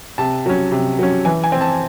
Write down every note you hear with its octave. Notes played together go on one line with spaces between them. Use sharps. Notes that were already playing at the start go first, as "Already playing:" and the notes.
C3 A5
F#3 C#4
C3
F#3 C#4
E3 G#5
G#5
C4
A5